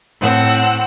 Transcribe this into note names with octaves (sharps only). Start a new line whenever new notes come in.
A2 C4 F#5 E6